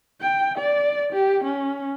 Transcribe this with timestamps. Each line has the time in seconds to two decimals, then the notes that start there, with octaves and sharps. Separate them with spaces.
0.21 G5
0.58 D5
1.13 G4
1.44 C#4